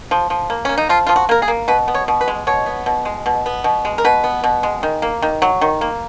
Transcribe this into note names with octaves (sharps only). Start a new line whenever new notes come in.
F3
F3
A#3
A#3 C#4
D#4
F3 F4
F3 F4
F#4
A#3 A#4
G#4
A#3
B2 B4
B3
C#5
B2
B4
G#3
B2 C#5
B3
B2
G#3
B2
B3
B2
G#3
A#4
B2 B4
B3
B2
G#3
D#3
A#3
D#3
F#3
D#3
A#3